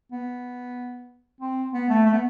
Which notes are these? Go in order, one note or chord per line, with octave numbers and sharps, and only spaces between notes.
B3
C4
B3
A3
A3
B3